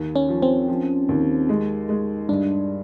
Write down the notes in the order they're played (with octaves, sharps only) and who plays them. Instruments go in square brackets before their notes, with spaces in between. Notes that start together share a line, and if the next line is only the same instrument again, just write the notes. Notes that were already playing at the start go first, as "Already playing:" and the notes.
Already playing: [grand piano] D#2
[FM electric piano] C#4
[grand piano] F3
[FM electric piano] C4
[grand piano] F3
D#2
G#3
G#3
[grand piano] G2 [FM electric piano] D4